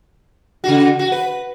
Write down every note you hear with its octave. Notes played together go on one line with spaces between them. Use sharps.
C#3 F#4
F#4
B4